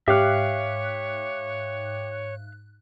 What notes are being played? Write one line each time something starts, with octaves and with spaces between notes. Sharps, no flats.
G#2 G4 C#5 E5 F5 F6 F#6